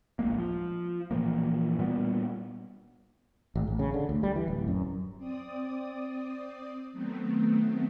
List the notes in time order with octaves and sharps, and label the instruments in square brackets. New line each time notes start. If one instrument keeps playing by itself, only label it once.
[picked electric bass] D1 A#1 G#3 A#3
F3
A#2 E3 F3 A#3
A#2 G3 B3
[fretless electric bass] G#1
A1
C#3
D3
D2
G3
E3
D1
F#2
[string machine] C4 D5 D#6
D#3 F#3 A3 B3 C4